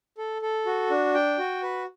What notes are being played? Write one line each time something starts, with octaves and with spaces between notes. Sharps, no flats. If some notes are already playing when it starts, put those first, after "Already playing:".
A4
A4
F#4
D4
G5
F#4
B4